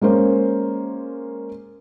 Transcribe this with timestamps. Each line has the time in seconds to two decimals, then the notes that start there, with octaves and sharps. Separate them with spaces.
0.01 G#3 A#3 C#4 C5